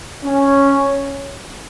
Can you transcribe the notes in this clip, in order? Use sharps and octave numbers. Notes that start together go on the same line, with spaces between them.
C#4